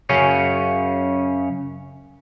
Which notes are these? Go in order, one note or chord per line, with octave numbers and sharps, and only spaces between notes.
F#2 C#3 C#4